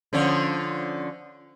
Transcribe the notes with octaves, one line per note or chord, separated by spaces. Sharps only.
D3 F3 C#4